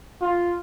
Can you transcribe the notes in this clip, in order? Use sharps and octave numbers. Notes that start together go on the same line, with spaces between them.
F4